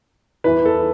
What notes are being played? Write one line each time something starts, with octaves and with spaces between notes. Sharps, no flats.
E2 E3 B4
A4